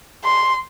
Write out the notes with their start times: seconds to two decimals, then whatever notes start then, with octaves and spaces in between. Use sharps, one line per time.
0.24 C6